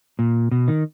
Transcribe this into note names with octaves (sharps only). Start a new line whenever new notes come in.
A#2
B2
D#3